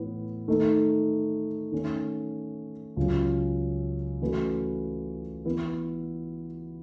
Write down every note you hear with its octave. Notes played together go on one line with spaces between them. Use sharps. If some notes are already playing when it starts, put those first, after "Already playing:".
Already playing: A2 E3 B3
D#3 A3 D#4
D#3 A3 C#4
C#2 C#3 F#3 C#4
E3 A3 C#4 F#4 B4
E3 B3 E4